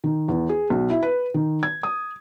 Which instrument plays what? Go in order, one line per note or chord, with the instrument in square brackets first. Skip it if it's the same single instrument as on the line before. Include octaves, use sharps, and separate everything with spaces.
[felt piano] D#3
E2
G#4
B1
E4
B4
D#3
G#6
D#6